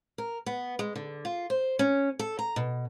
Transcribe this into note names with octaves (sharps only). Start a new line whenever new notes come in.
A#4
B3
G#3
D3
F4
C5
C#4
A4
A#5
B2